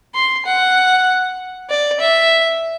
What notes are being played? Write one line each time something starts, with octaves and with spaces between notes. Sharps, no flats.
C6
F#5
D5
E5